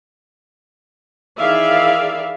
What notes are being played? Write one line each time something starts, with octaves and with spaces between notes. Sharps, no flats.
D#3 E3 G#4 D5 E5 F5